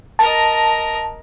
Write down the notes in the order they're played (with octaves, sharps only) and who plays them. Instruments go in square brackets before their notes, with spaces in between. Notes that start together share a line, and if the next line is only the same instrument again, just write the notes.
[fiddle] A#4 D#5 [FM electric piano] A5